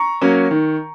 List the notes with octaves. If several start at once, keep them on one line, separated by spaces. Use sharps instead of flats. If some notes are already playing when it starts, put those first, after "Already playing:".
Already playing: A#5 C#6
F#3 A#3 C#4
D#3